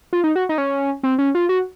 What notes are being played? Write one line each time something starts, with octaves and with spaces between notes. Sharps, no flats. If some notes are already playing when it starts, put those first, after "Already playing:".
F4
D#4
F#4
D#4
C#4
C4
C#4
F4
F#4